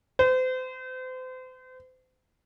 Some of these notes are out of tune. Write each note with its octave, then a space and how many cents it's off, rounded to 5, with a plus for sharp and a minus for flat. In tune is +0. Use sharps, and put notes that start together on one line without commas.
C5 -35